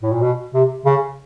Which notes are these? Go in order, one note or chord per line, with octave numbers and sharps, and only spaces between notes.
A2
A#2
B2
C3
C#3